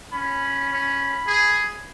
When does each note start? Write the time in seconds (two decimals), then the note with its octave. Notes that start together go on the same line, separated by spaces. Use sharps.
0.12 C#4 B5
0.73 C#4
1.28 G#4